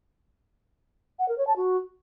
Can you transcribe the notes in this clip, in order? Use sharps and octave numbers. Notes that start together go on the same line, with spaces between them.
F#5
A#4
C#5
A5
F#4